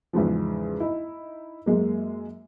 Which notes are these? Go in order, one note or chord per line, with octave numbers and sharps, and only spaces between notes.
E2 G#2 C#3 F3
D#4 E4
F#2 G#3 A#3